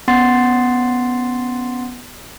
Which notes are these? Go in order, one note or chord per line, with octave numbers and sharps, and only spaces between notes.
B3 C#4 F#5 C6 A6 C7